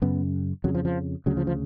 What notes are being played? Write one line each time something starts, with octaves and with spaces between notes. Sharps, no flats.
F#2 C#3 B3
F2 C#3 F#3
F3
F3
D2 C#3 F#3
F3
F3